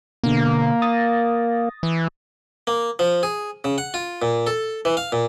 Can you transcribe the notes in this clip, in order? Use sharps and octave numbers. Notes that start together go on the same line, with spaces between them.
B2 D3 A#3
D#6 A6 A#6
E3
A#3
F3
G#4
C#3
F#5
F4
A#2
A4
E3
F5
A#2